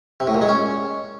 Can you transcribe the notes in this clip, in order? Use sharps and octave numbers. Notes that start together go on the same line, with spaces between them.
C3
A2
A#2
G#3
C#4